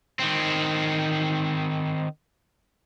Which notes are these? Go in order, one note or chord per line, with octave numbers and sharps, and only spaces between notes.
D#3 C4